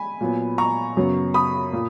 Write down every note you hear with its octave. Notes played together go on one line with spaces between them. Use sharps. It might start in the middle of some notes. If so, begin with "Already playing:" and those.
Already playing: G#5 B5
A#2 F#3 B3
A#5 C#6
F#2 C#3 F#3 B3
B5 D#6
A#2